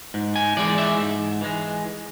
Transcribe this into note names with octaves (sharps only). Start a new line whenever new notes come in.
G#2
G#5
E3 G#3 D5
E5
G#2
E3 G#3